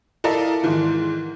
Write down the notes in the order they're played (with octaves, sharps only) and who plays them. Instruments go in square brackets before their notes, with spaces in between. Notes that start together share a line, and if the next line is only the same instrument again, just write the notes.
[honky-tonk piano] E4 A4 A#4 D5 D#5 F5
G#2 D#3 E3